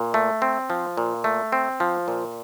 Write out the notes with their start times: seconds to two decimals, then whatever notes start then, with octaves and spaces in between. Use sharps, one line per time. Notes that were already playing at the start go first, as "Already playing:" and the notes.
Already playing: A#2
0.14 A3
0.42 C4
0.70 F3
0.97 A#2
1.24 A3
1.52 C4
1.80 F3
2.08 A#2